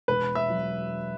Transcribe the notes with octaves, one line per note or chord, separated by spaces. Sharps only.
E1 B4
E5
F#3